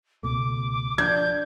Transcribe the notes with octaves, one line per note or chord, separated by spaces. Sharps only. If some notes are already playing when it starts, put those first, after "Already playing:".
C#2 B2 A3 D6
F3 D4 G6 G#6